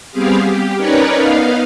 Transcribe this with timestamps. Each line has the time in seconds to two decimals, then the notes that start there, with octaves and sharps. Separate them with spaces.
0.11 G3 B3 C4 G4 G#4 F5
0.44 G4
0.76 C#4 D#4 A#4 B4 C#5 D5
1.14 B3 D#4 F5